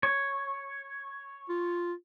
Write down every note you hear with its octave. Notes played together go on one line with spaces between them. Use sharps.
C#5
F4